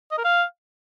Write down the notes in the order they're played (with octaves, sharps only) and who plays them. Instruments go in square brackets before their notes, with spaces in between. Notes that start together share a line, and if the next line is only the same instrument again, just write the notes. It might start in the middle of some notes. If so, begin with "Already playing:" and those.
[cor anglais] D#5
A#4
F5